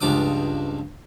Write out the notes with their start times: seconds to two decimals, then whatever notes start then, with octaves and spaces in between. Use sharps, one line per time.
0.01 C#2 G2 F3 D6 D#6